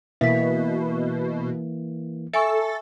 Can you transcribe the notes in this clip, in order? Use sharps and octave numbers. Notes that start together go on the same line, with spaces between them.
B2 E3 A#3 E5 B6
A4 E5 G#5 C#6